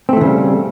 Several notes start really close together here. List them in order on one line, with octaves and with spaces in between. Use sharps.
C4 A3 E3 C#3 G3